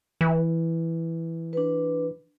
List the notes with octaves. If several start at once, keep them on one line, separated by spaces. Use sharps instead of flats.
E3
D4 B4